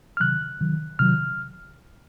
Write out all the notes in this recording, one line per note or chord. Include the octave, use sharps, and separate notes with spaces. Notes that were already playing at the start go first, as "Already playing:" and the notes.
F6
C3 D#3 F#3 F#6
C3 D#3 F#3
C3 D#3 F#3 F6